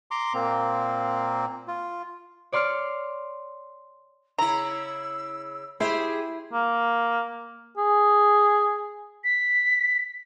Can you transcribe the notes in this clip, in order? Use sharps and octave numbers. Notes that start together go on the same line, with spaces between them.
A#5 C6 D6
A#2 A#3 C4
F4
C#5 D5 C6 F6 C7 C#7
C#3 E4 A#5 E6
E4 G4 G#4 C5
A#3
G#4
B6